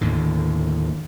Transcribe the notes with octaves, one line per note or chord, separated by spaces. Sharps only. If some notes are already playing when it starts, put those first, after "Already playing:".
D#2 A2 D3